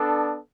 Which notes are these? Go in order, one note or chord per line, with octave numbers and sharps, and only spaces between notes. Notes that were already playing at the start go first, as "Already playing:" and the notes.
Already playing: B3 D4 A4